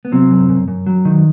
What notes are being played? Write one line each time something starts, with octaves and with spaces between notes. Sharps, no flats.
B3
C3 F#3 C4
F#2
F#2
F#2
F#3
D#3